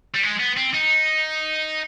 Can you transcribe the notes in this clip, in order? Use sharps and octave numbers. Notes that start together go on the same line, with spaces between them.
G3
G#3
B3
C4
D#4